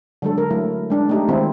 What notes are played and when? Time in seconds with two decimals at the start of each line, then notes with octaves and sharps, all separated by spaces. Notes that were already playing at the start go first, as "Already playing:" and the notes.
0.22 D3 F#3 G#3 A4
0.38 A#4
0.50 F#3 A3 E4
0.90 G#3 D4
1.09 A3 D#4 G4
1.29 D#3 G#3 C4 E4